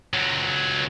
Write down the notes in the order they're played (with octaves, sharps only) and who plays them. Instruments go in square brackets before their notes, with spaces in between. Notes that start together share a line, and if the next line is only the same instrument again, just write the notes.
[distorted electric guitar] C#2 F#3